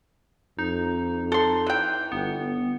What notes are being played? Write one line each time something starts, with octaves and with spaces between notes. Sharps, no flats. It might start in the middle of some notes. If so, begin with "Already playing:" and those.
F2 D#4
A4 C6
E3 G5
G1 B3